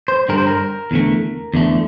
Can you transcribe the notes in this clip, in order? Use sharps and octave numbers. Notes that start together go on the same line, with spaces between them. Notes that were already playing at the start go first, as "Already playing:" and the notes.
C5
G2 D3 G3 A#4
C5
A#4
E2 D3 A3
E2 D3 A3